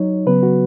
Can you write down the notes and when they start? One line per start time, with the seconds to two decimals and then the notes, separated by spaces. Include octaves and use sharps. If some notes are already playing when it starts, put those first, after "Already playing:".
Already playing: F#3 D#4 C#5
0.26 C#3 F#3 B3 B4
0.43 F#4